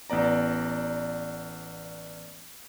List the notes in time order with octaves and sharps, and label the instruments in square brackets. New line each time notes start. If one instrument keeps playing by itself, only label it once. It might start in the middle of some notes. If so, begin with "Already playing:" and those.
[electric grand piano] A1 B3 D5 A#5